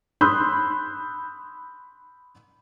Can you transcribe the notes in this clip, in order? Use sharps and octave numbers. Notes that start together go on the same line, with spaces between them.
B5 C6 D#6 E6 F#6 G6